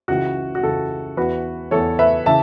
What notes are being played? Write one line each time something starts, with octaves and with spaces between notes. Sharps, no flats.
C#2 C#3 E3 F#4
F#4
C#2 C#3 E3 A4
E2 E3 F#4 B4
E2 E3 A4 C#5
B4 E5
C#3 E3 E5 A5